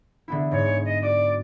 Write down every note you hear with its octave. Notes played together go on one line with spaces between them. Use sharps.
D3 B3 E4
G#2 C#5
D#5
F#4 D5